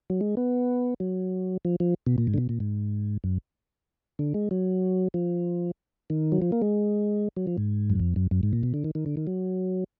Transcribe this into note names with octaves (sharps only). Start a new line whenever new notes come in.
F#3
G#3
B3
F#3
F3
F3
B2
A#2
G#2
D3
B2
A#2
G#2
F#2
D3
G#3
F#3
F3
D#3
F#3
F3
A#3
G#3
F#3
F3
G#2
F#2
F2
F#2
F#2
G#2
A#2
B2
D3
D#3
D#3
D3
D#3
F#3